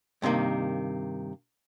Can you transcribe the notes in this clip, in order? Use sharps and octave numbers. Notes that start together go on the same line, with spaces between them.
G2 C3 D#3 A#3